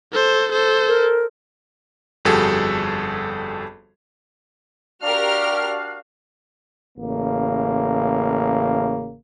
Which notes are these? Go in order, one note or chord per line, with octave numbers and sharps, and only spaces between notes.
A4 C5
A4 C5
A#4
G1 F2 G3 F#4 G#4 A4
D4 F#4 G4 A#4 F5 F6
A1 C#3 A#3